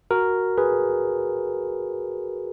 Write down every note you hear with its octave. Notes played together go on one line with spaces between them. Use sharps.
F#4 A#4
G#4 B4